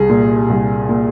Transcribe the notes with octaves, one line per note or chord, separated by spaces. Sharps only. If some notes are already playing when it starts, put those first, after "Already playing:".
Already playing: C2 G#4
A#2
C2
A#2